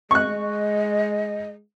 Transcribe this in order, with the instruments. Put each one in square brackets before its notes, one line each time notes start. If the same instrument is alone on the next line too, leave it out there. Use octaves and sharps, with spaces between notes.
[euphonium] G#3 [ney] D#5 [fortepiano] C#6 F#6